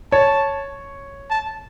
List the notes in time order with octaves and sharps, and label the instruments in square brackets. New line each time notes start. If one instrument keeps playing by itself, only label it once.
[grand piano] C#5 [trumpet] A5
[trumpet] A5